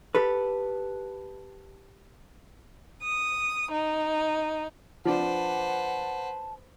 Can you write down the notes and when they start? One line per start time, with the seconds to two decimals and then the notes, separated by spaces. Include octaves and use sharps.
0.15 G4 A4 B4
3.03 D#6
3.70 D#4
5.05 F3 D4 B4 C5 F#5 A5